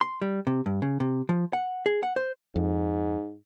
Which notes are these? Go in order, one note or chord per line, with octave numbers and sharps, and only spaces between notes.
C6
G3
C3
G2
C#3
C3
F3
F#5
G#4
F#5
C5
F2 G#2